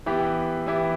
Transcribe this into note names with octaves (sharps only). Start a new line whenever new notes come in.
E3 B3 E4 G4
E3 B3 E4 G4